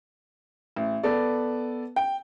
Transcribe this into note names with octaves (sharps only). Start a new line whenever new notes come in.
A1
B3 A4 D5
G5